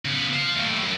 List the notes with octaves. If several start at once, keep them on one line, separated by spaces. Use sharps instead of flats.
C#3 B3
C5 F5
D#2 A2
F#2